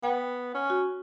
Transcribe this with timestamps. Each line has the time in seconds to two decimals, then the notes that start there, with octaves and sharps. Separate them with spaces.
0.03 B3 G5
0.54 C#4
0.70 F#4